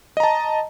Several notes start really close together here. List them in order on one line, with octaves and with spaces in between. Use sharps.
D#5 A#5 A5